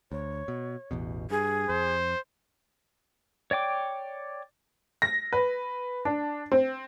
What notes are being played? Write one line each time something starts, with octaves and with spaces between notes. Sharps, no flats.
D2 C#5
B2
A1 E2 B2
G2 G#4
F2 C5
C#5 D5 G5 D6
A#6
B4
D4
C4